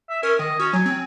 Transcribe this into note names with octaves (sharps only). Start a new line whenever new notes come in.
E5
C#4 A#4
D#3 D#5
C#4 F#4
F#3 G#5
C4